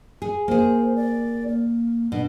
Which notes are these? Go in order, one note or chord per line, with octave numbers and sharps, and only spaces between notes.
G#4
A#3 G#4 C5
D5
A#3
B2 D4